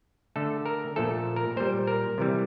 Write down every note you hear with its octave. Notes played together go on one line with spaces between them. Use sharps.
D3 A3 A4
A#4
A#2 F3 A3 A4
A#4
A#2 G3 C5
A#4
C3 E3 G3